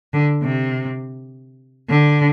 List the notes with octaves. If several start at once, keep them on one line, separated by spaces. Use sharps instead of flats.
D3
C3
D3